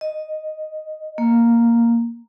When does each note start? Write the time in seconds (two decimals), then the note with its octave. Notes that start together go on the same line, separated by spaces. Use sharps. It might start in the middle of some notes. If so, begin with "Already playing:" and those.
0.01 D#5
1.18 A#3